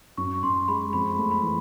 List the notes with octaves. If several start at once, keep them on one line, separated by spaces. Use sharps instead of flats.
F#2 C#6
F#2 C6
G#3 B5
F2 B5
A3
B5
E3